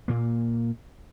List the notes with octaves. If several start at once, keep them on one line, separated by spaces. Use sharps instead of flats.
A#2 A#3